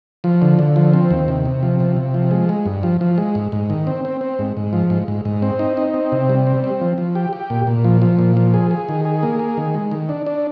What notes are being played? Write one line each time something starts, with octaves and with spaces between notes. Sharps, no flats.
F3
D3
D3
F3
C4
D#2
C3
C3
F3
C3
C3
F3
G#3
G#3
G2
F3
F3
G#3
G#2
G#2
D#3
C4
C4
C4
G#2
G#2
F3
G#2
G#2
G#2
C4
D#4
D#4
C4
C3
G3
C4
C4
F3
F3
G4
G4
A#2
A#2
F3
F3
A#2
F3
G#4
G#4
D#3
G#4
A#3
G#4
D#3
G#3
D#3
D4
D4